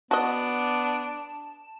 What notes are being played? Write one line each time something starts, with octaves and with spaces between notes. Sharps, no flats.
B3 D4 F#4 D#5 A5